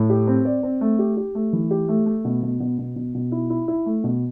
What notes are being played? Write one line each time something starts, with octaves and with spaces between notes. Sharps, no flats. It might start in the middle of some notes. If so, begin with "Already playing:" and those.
Already playing: A2
G4
C4
D5
C4
A3
G4
G4
A3
E3
G4
A3
A3
B2
B2
B2
B2
B2
B2
E4
E4
E4
A3
B2